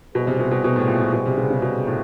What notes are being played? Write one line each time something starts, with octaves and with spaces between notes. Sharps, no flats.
B2 G3 B3 E4 G#4 C5
C3
B2
B2
B2
A2
A#2
A#2
B2
C3
C#3
C#3
B2
A2